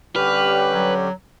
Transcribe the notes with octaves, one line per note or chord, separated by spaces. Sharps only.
D3 G3 C#4 G4 B4 F6
F#3